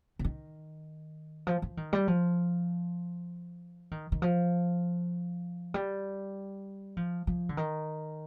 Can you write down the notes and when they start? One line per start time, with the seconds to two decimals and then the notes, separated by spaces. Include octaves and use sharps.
0.19 D3
0.25 D#3
1.47 F3
1.62 F3
1.77 D#3
1.93 G3
2.08 F3
3.91 D#3
4.12 D#3
4.22 F3
5.74 G3
6.97 F3
7.27 F3
7.49 D3
7.57 D#3